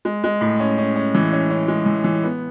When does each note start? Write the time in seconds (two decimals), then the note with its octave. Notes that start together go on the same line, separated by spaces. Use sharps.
0.05 G#3
0.24 G#3
0.41 A2
0.60 C#4
0.78 C#4
0.96 C#4
1.15 E3
1.32 C#4
1.50 C#4
1.68 G#3
1.86 E3
2.04 E3
2.23 B3